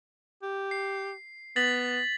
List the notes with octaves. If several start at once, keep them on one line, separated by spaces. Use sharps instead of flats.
G4
C7
B3 A6 B6 F#7